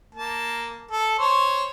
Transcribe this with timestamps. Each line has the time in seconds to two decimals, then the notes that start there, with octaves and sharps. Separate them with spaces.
0.15 A#3 A5
0.91 A4
1.18 C5 C#5